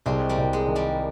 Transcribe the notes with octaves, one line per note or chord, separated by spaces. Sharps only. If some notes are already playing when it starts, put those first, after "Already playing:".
C2 G#3 C4
G3 A#3
C2
G#3
D#3
G3 A#3